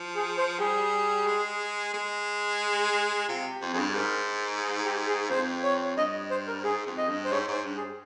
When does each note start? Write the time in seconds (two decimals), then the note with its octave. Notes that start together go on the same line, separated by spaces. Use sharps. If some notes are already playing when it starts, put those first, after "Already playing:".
Already playing: F3
0.15 G#4
0.38 C5
0.59 G3 G#4
1.27 G#3
1.94 G#3
3.28 C3 F4
3.50 G4
3.62 F2
3.73 F2 G#4
3.79 G2
3.95 G#2 A#4
4.62 G#4
4.85 G4
5.08 G#4
5.30 F2 C5
5.63 C#5
5.96 G2 D#5
6.31 C5
6.47 A#4
6.64 G#2 G#4
6.87 F2
6.98 D#5
7.09 G2
7.25 C5
7.31 G#2 C#5
7.48 G#2
7.53 C5
7.65 G2
7.76 G#4